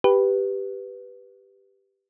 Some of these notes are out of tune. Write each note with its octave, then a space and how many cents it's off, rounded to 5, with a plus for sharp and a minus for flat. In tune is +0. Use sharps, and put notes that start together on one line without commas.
G4 +0 B4 +0